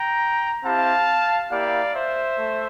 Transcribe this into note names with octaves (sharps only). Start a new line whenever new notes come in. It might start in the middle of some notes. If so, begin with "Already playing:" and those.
Already playing: G5 A#5
C4 E4 G4 F5 A5
A#3 E4 G4 D5 F5
C5 E5
A3